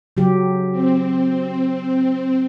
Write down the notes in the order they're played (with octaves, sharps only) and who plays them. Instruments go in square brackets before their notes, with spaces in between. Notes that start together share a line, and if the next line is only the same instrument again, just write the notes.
[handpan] C#3 F#3 G4
[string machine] C4